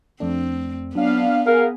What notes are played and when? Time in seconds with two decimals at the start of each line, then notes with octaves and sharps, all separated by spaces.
0.20 F2 A3 C4 D4
0.95 F#3 B3 C#4 D4 F5
1.47 G#4 A#4 F5 F#5